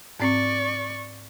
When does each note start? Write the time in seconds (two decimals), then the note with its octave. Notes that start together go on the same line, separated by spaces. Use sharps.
0.20 G#2 C4 D5 C#6